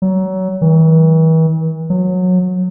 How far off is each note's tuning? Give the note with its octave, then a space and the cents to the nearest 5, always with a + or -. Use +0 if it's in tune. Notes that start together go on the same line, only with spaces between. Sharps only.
F#3 +25
E3 -40
F#3 -20